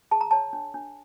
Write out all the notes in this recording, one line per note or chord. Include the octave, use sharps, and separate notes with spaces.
G#4 A5
A#5
C#5 A5
D4
D4